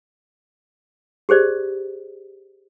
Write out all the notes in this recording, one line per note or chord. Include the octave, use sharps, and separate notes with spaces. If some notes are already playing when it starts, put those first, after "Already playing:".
G4 G#4 C5 D5